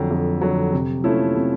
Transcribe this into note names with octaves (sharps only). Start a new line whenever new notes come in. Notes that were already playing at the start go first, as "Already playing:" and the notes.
Already playing: F2 D3 F#3
F2
D3 F#3
C3
F3 A3 C#4 E4
C3